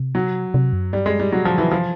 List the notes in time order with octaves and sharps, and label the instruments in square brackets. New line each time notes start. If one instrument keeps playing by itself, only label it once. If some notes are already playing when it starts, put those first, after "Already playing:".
Already playing: [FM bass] C3
[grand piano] F#3
[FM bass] C3
F#2
[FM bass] G2 [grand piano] G3
[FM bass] F#2 [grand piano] G#3
[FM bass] G2 [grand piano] G3
[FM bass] C3 [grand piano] F#3
[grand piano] F3
[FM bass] D3
[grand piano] E3
[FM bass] C#3
[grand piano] F3
[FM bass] C3